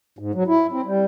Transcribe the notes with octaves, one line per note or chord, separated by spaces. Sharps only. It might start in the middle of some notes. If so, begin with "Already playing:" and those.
G#2
F#3
E4
C4
G3